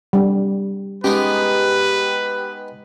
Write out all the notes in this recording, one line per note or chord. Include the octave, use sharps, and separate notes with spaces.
G3 D4
G#3 B3 C#4 D#4 G4 B4